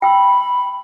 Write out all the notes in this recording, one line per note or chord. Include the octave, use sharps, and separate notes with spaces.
G5 B5 E6